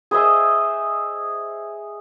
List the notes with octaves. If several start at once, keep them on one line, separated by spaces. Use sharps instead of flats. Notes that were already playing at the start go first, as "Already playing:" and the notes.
G#4 C5 D#5 E5